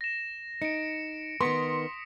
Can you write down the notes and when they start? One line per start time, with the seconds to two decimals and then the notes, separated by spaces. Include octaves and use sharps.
0.01 A#6 E7
0.62 D#4 C#7 D7
1.41 D#3 B3 C6 D#6 B6 C#7